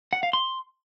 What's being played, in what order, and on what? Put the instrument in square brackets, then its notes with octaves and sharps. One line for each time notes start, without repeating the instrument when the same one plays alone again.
[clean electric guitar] F#5
F5
C6